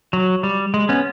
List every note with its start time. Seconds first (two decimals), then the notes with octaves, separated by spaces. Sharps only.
0.13 F#3
0.43 G3
0.74 G#3
0.89 B3 C#4